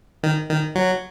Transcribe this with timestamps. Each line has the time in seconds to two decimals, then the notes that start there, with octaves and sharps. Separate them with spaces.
0.23 D#3
0.50 D#3
0.75 F#3